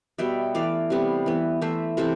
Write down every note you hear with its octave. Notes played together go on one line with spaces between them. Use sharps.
B2 G3 B3 E5 G5
E3 A3 D5 F5
C3 G3 B3
E3 B3
E3 A3 C5 E5
C3 E3 A4 C5